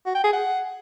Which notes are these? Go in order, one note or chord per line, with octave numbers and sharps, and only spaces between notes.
F#4
G5
G#4
F#5